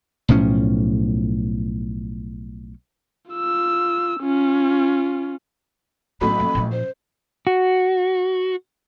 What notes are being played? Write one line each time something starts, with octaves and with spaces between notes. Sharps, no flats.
B1 A2 F3 C#4
F4 E6
C#4 F4
A1 A2 F#3 B3 D4 B5
F3 A#3
A#2 F3
C5
F#4